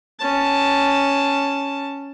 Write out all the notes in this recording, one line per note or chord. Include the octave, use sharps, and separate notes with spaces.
C#4 A5